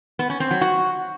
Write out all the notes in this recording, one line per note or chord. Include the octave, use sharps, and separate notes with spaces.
B3
C#4
C4
F#3
F#4